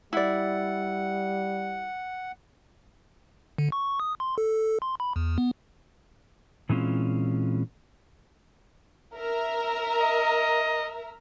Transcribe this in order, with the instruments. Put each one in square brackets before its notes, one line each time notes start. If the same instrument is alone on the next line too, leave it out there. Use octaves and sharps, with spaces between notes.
[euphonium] G3 [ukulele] E4 D5 [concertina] F#5
[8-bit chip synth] D3
C#6
D#6
C6
A4
C6
B5
E2
B3
[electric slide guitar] A#2 E3 G#3 C4 C#4 F4
[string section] A#4 E5 A#5
[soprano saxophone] D#5